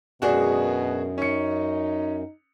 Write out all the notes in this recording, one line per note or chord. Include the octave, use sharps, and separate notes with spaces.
F#2 B2 D#3 G#3 D4 F#4 G#4
C#4 D#4 C#7